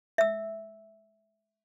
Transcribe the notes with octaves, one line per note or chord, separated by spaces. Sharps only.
E5 E6